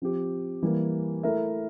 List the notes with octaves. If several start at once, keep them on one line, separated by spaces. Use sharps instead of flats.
F3 C4 G4
E3 G3 A#3
A3 E4 A#4 E5